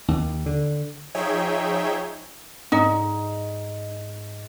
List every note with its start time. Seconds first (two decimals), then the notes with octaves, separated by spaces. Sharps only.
0.08 D#2
0.46 D3
1.15 F3 D#4 G#4 C#5 E5 G5
2.72 G#2 D#4